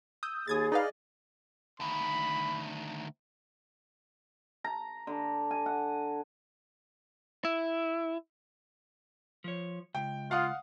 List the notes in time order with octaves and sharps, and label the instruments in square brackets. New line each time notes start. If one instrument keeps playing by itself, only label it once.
[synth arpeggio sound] D#6 E6 G6
[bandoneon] D#2 [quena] G#4 [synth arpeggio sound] D#6 G#6 A6
[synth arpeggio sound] D#4 B4 F5 [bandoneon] D5 D#5
[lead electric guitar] D2 D#3 [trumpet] B5
[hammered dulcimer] A#5
D3
G#5
F#5
[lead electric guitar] E4
[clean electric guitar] F3 C#5
[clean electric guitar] C#2 [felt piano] G5
[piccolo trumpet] F4 [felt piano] F5 F#5 D#6